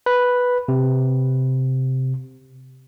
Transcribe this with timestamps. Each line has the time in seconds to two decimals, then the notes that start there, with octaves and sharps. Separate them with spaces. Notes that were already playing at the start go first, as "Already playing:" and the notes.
0.06 B4
0.68 C3